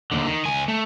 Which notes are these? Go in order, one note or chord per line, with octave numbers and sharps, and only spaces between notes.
D#2 D3
D#3
C#2 G#5
A3